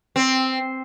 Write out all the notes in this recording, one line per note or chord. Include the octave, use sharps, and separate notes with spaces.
C4